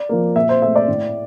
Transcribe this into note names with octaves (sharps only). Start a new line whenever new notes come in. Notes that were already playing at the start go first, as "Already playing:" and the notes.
Already playing: D5
F3 A#3
A#2 E5
C5
A3 E5
D5
A2